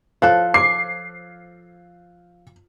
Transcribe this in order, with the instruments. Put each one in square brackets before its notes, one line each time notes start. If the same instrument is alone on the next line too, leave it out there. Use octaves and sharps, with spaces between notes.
[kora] F3 A4 [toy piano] C5 C#5 [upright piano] F5 F#6
[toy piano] D6 [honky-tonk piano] C7